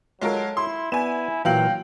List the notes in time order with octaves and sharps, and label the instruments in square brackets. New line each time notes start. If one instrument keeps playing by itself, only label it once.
[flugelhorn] F#3 [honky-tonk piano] G#3 F4 A#4 [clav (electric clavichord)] A4 C#5
[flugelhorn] E4 [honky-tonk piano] C6
[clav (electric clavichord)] B3 D5 [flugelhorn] E4 [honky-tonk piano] G#5 E7
[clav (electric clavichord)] A#2 E3 [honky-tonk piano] F#3 F5 F#7 [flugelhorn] G5